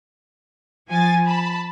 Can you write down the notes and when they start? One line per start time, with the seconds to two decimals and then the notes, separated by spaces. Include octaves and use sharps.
0.89 F3 G#5 A6
1.25 A5 B5